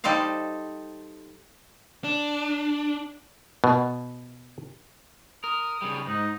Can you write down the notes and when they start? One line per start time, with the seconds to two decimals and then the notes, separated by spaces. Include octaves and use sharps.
0.04 G3 D#4 A4 C5 F5
2.04 D4
3.64 B2
5.44 A#4 D#6
5.82 C#3 G3
6.07 G#2 D#4